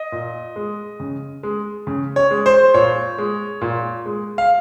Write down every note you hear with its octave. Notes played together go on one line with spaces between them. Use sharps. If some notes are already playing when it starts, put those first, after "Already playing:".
Already playing: D#5
A#2
G#3
C#3
G#3
C#3
C#5
G#3
C5
A#2 C#5
G#3
A#2
G#3
F5